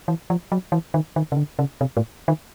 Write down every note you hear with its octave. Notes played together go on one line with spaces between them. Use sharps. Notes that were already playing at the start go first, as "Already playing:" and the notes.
E3
F3
F#3
E3
D#3
D#3
C#3
D3
C#3
C3
A2
D#3